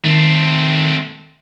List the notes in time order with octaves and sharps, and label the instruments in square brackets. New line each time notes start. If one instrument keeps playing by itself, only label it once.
[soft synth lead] D#3 [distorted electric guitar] A3 C4